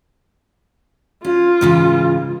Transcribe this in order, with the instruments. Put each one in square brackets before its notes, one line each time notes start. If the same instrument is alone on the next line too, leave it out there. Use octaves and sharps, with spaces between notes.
[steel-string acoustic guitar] C#4 [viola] F4
[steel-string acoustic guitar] G#2 C#3 E3